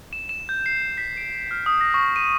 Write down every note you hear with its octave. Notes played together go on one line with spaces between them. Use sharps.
E7
E7
G6
C7
B6
D7
F6
D#6
A#6
C#6
D#7